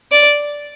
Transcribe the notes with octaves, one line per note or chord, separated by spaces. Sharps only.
D5